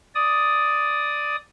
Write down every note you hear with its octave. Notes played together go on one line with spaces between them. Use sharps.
D5 D#6